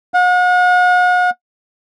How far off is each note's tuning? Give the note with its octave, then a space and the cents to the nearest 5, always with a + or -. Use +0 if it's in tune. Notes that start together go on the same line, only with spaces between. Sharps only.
F#5 -40